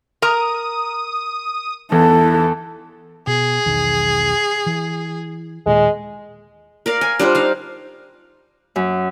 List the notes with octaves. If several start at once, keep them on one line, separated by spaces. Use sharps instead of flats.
A#4 A#5 D#6
E2 E3 A4
B2 G#4
B1 E2 D#3
E3
D#2 A#2 G#3
A#4 D5 F5
G#5
G3 D4 F4 C5
D#4 F5
F#2